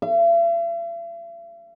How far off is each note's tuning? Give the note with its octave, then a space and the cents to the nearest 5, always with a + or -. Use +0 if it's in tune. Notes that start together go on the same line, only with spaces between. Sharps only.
E5 +45